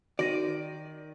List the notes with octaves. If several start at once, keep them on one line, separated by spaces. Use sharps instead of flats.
D#3 F#4 D5 A#6 D#7